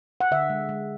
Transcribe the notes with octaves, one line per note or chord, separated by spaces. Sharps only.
F#5
D3 E5
G#3
G#3